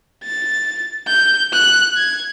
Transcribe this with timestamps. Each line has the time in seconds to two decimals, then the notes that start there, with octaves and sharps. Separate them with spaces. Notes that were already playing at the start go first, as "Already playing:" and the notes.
0.23 A6
1.07 G6
1.53 F#6
1.97 G#6